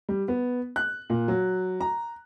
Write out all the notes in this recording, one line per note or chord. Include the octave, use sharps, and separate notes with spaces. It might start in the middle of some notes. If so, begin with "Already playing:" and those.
G3
B3
F#6
A#2
F#3
A#5